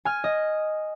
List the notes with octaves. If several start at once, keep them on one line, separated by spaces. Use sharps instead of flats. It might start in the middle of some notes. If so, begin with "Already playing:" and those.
G#5 F6
D#5